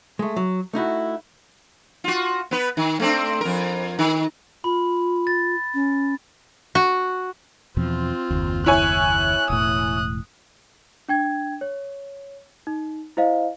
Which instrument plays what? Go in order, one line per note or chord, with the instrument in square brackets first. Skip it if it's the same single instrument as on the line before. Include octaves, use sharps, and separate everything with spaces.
[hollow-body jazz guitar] G#3 A3
F#3
A3 D#4 E4 F#4
[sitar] F4 F#4
B3 B4
D#3
A3 C4 D4
F2 A#4
D#3
[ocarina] F4 [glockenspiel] B5
[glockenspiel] A6
[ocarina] C#4
[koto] F#4
[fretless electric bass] E2 B2 F3 [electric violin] C4 F4
[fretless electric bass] F#1 D#2
[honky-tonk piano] E4 C#5 G#5 [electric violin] F#6
[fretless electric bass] E1 A2 [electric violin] D#6 F#6
[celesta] D4 G5 G#6
C#5
D#4
E4 C5 D#5 F5